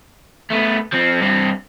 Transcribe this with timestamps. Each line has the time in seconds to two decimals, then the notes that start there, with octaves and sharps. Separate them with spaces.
0.50 A3 B3
0.93 F3 C4
1.21 G2 C4